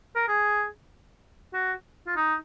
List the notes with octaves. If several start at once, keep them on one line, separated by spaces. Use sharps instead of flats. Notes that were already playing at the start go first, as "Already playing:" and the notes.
A#4
G#4
F#4
F4
D#4